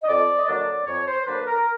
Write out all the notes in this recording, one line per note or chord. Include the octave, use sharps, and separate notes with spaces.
D#5
F2 D5
D#5
D3 F#3 A#3 D4 D5
F2 C#5
C5
D3 F#3 A#3 D4 B4
A#4